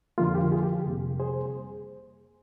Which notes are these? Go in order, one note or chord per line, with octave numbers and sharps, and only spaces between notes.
F2 D3 F3 A#3 F4
G4
F4 G#4
G4
F2 C3 G3 A#3
G#4 C5